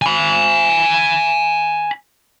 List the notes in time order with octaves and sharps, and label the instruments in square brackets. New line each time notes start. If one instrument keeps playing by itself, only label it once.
[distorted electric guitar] G#5 B5